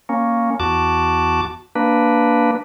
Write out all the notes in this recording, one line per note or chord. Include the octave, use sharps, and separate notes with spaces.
A#3 C#4
E2 F#4 A5 D6
A#3 D4 B4